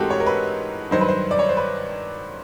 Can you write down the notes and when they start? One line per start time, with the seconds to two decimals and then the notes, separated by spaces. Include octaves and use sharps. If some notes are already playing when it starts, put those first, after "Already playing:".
Already playing: G#2 E3 A3 C4 F#4 G4 A4 A#4
0.10 C#5
0.20 A#4
0.26 B4
0.91 G2 D#3 F#3 C5
1.01 B4
1.08 C5
1.31 D5
1.39 C#5
1.49 C5
1.57 B4